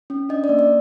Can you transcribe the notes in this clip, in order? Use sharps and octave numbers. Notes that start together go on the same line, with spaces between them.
C#4
D4 D#5
D5
A#3
D5